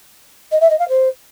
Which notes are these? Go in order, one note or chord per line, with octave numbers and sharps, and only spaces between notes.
D#5
E5
D#5
F5
C5